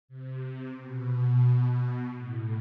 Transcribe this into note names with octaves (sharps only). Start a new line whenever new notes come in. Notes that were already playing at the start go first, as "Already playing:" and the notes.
C3
B2
A2